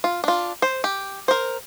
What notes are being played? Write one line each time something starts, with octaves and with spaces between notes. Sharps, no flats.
F4
D4 F4
C5
G4
A#4 C5